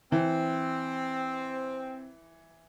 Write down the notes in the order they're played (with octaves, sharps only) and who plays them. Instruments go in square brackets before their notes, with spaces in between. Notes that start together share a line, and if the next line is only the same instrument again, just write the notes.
[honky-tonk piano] E3 [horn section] C4